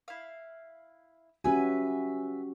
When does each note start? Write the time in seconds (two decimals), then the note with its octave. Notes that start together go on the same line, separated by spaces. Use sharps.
0.08 E4 F5
1.44 C#4 F#4 G4 B4 E5 G#5